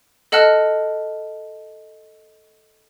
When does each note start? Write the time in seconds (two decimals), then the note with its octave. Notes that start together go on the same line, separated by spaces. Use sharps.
0.32 A4 D#5 F#5 A5 F6 F#6